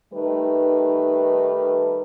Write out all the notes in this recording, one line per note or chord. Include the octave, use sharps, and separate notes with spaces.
D#3 G3 A3 D#4 B4